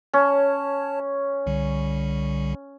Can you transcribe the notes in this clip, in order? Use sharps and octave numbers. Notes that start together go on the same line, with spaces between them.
C#4 C#5 A5
C2 D3 G3